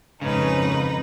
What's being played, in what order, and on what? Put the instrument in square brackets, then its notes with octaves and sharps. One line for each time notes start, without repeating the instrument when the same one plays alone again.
[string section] G#1 F2 G#2 [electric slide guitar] C#3 [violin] D#4 B4